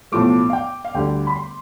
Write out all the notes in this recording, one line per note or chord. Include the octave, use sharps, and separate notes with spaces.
B1 A2 F3 A3 D6
F5
G5
F5
D2 D3 G3 G5
B5
C6